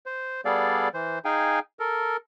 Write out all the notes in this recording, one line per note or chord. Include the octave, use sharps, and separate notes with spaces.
C5
G3 B3 G#4 A4 D5 F5
E3 C5
D#4 G#4 F5 G5 G#5
A4 A#4